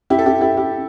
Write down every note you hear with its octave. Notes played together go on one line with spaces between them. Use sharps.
E4 G4
A4
E4 G4
E4 G4
E4 G4